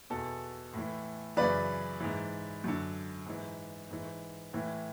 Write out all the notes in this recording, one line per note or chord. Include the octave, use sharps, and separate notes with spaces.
E2 B2 A4
A2 E3
F#2 C#3 E3 B4 D5
G#2 E3
F#2 D3
G#2 E3
G#2 E3
A2 E3